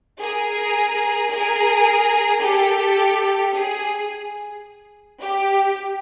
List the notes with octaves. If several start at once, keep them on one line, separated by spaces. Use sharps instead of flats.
G#4 A#4
G#4 A#4
G4 A4
G#4
G4